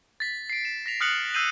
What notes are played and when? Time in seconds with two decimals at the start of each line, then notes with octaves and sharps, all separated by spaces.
0.20 A6 B6
0.50 C7 D7
0.65 E7
0.86 A#6 B6 F7
1.00 D#6 F6 F#6 C#7 F#7
1.34 E6 G6 C7 D#7 F#7